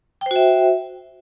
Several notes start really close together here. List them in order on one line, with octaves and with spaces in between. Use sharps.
G5 C5 F#4 E5